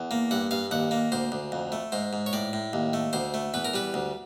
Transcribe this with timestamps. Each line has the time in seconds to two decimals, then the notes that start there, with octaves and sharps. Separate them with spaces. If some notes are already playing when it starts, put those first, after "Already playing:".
Already playing: E2
0.11 A#3
0.31 G2 F#5
0.51 G2 F5
0.71 D#2 F#5
0.91 A#3
1.12 D2 C5
1.32 D2
1.52 F2
1.72 A3
1.92 G#2 C5
2.13 G#2
2.26 C#5
2.33 A2 D5
2.53 A2
2.73 D#2
2.93 A3
3.13 D2 C5
3.34 A3
3.54 E2 B4
3.65 A#4
3.74 G3 B4
3.94 D2